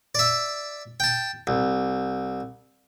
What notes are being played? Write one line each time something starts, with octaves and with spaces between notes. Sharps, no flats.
D5 E5
G5 A5
C2